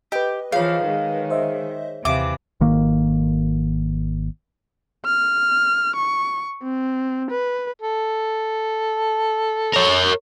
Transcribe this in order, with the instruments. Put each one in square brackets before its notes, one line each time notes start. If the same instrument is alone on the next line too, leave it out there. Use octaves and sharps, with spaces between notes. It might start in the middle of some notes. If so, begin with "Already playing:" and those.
[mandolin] G4 [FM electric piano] B4 D#5
[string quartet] E3 F3 [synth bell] G#4 C#5 [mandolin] F5
[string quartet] D#3 G#3
[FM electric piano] C5 D#5 E5
[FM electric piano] D#2 [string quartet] C3 E3 [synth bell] E5 F5 [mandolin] D6
[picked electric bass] G#1 D#3 A#3
[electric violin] F6
C#6
C4
B4
[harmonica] A4
[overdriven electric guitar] A#4 C#5